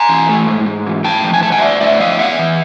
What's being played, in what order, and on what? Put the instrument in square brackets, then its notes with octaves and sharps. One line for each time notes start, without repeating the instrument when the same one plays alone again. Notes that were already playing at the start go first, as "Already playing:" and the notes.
Already playing: [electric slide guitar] G#5 A#5
E3
A3
G#2
G#2
E3
A2 G5 A5
F3
G#5
A3 A5
F#5 G#5
D#5
A2 D5 E5
A2 D5 E5
F3 D#5 F5
B3 E5 F#5
E3